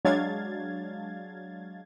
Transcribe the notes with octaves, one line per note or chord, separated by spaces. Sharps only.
F#3 G#3 D4 F5 G#6 A6